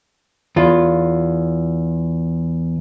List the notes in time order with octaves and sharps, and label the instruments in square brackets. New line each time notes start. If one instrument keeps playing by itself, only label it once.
[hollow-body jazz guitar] E2 F4